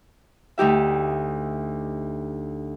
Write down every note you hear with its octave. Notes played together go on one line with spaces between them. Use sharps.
D2 D#4 G4 E5